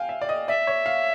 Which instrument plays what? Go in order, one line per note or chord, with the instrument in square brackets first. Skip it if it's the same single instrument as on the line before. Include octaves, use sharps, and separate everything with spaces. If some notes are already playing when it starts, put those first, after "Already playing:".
Already playing: [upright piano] F5 G5 G#5
E5
D5
D#5
[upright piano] D5 [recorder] E5
[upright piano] C#5
F5